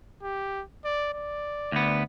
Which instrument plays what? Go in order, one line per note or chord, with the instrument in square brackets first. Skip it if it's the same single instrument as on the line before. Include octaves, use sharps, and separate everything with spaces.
[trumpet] G4
D5
D5
[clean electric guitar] D2 B3